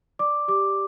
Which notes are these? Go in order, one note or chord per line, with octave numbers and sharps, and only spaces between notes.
D5 D6
G4 D6